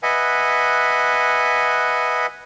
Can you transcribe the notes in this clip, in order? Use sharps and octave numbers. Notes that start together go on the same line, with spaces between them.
B4 D#5 E5 F#5 G#5